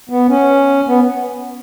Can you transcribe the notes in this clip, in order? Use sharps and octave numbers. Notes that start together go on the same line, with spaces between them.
B3
C#4
B3